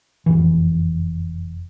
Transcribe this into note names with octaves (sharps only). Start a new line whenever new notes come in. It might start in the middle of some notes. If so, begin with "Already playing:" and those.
F1 F#2 E3